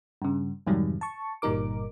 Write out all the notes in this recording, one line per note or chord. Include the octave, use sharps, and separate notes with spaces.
G2 C#3
F2 G#2 C3 D#3 F#3 G3
A5 C#6
G1 A#2 G3 D#4 A#4 D6